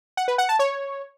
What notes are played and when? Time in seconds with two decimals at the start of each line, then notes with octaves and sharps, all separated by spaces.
0.17 F#5
0.28 B4
0.38 F#5
0.49 A5
0.59 C#5